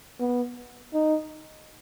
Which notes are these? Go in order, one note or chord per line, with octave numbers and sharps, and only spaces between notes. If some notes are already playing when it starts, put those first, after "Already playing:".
B3
D#4